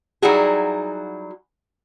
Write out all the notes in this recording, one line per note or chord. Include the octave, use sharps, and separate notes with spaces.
F#3 G3 D#4 E4 F#4 G#4